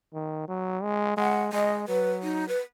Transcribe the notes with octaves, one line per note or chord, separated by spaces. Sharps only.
D#3
F#3
G#3
G#3 F#5
G#3 D#5
F#3 B4
D#4
B4